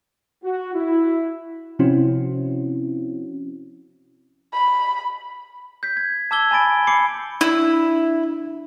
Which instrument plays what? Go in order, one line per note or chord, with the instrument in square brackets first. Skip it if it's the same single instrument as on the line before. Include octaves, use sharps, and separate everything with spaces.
[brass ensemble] F#4
E4
[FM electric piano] C3 F3 C4 C#4 E4 F#4
[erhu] B5
[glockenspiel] G6 B6
G#6
A5 D6 E6 G#6 G7
G#5 A5 B5 A6 D7
B5 D6 C7 C#7
[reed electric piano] D4 [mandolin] E4